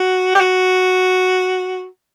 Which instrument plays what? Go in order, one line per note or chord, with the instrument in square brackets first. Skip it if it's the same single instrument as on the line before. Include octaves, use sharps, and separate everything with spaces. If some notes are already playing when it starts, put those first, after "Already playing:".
Already playing: [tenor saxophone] F#4
G4
F#4